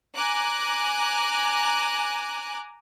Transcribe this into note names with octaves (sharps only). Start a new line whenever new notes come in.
G#5 A#5 D6 F#6